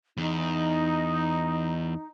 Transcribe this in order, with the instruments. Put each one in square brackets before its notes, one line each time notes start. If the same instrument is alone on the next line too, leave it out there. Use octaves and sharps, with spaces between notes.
[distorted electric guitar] E2 [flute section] D#4